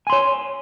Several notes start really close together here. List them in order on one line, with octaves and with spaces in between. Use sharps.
G#5 C6 C#5